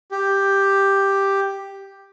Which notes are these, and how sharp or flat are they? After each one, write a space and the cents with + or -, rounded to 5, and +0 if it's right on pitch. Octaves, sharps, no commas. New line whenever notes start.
G4 +5